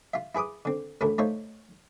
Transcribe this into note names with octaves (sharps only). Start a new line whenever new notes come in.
F4 E5
E4 G#4 B4 D6 D#6
D3 C4
A1 D2 A2 A3 E4 A#4
A3 D#4 F4 C5 C#5 E5